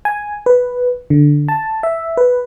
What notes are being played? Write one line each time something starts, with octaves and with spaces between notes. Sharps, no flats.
G#5
B4
D3
A5
E5
B4